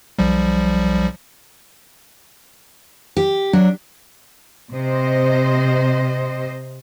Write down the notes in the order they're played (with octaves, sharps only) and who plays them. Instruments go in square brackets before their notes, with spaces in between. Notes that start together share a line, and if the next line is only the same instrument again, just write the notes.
[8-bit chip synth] B1 F3 G3
[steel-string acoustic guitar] G4
[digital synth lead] F#3 [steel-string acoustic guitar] D4
[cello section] C3 C5 D#5